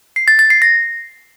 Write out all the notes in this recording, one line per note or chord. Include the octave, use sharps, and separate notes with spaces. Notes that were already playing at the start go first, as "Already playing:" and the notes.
C7
A6
A6
C7
A#6